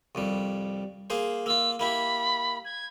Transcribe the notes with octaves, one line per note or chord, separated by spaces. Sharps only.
C2 F2 G3
A#3 G#4 C5
A#3 F4 E6
A#3 E4 G4 B5
G#6